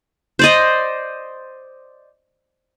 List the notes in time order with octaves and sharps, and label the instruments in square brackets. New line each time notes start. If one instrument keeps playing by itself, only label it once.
[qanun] C5 D5 D#5